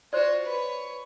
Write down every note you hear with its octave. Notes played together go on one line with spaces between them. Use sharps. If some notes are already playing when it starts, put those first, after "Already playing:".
F4 F#4 C5 D5
B4 C#5